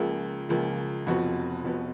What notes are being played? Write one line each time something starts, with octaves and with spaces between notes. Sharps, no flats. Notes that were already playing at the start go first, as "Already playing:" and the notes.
Already playing: C#2 C#3 F3 A#3
C#2 C#3 F3 A#3
F1 F2 F3 B3 F#4
F1 F2 F3 B3 F#4